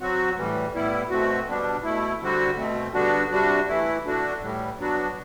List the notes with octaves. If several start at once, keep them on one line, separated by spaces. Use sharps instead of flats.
F#3 C4 F#4
A2 E3 G3
A2 G3 B3 E4
B2 A3 C4 F#4
B2 G3 B3 D4
B2 A3 E4
D3 G3 C4 F#4
B2 A3 C4
D3 G3 B3 D4 F#4
C3 G3 D4 F#4
E3 A3 E4
D3 A3 D4 F#4
A2 E3 G3
F#3 B3 D4 F#4